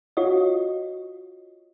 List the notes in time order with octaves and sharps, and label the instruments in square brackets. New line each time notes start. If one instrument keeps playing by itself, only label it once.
[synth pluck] F4 F#4 C#5 D#5